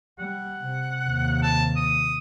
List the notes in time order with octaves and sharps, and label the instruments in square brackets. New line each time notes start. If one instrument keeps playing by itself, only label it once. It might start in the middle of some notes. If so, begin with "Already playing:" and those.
[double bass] G3 [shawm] F#5
[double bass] C3
D#2 C3
[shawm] A5
D#6